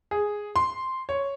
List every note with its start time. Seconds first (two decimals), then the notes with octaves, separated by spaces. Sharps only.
0.11 G#4
0.56 C6
1.09 C#5